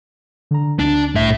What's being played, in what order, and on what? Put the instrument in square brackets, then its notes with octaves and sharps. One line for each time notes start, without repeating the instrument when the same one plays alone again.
[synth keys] D3 A#5
[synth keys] D2 [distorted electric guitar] D4
[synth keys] C2 [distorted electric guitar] A2 E5